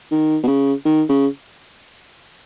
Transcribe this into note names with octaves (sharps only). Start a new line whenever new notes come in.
D#3
B2
C#3
D#3
C#3